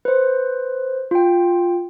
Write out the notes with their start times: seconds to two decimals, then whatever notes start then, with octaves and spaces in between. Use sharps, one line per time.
0.05 B4 C5
1.11 F4 G5